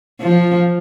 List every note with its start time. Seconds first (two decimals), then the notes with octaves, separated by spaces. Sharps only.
0.20 F3